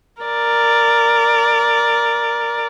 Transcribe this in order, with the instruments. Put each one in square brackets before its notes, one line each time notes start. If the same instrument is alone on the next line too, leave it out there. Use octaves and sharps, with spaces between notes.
[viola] A#4 D5